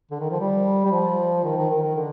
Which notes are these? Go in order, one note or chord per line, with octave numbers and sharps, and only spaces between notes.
D3
D#3
F3
G3
G3
F3
D#3
D#3
D#3
D#3
D3